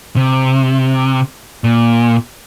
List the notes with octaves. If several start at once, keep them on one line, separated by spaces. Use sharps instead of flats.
C3
A#2